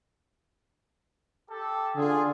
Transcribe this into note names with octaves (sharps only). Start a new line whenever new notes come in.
G4 A4
D3 F4 G#4